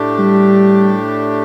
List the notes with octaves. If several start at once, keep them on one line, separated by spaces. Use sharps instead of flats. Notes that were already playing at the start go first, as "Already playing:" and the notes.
Already playing: A2 A3 D4 G4
G3